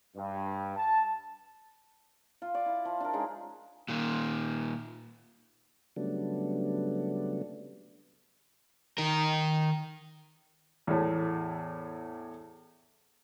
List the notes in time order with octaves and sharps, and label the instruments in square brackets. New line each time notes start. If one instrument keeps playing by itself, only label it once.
[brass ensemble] G2
A5
[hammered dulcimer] F4
D5
E4
F3
D4 A#4
G#3 C#4 D#4 G#4
[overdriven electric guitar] A#2 D#3
[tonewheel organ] C#3 F#3 G3 A3 B3 D4
[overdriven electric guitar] D#3 A#4
[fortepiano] E2 A2